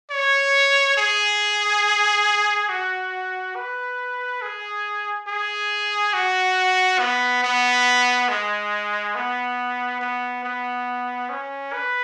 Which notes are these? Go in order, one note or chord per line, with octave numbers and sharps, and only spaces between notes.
C#5
G#4
F#4
B4
G#4
G#4
F#4
B3
B3
G#3
B3
B3
B3
C#4
B4